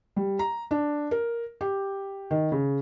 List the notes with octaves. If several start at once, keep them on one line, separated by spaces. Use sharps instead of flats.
G3
A#5
D4
A#4
G4
D#3
C#3